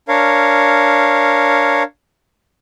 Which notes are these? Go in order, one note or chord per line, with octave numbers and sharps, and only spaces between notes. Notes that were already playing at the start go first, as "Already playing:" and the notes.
D4 A#4 C#5 F5